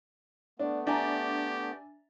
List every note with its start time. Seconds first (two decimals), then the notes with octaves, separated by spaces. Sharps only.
0.59 A3 B3 D4
0.87 D4 G4 E5 G#5 A#5